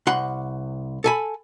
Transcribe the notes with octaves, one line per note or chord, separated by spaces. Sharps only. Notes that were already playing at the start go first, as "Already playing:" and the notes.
C2 F#5 C6
A4 G#5 B5